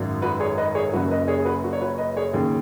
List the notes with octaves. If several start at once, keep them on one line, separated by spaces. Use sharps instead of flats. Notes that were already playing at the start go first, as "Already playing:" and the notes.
Already playing: G#1 F#2 F#3
F#4 B4
G#4 C#5
B4 D#5
G#4 C#5
F#1 F#2 F#3 F#4 B4
B4 D#5
G#4 C#5
G#4
F#4 B4
F#4
C#5
F#4 B4
B4 D#5
G#4 C#5
D#2 C#3 F#3 G#4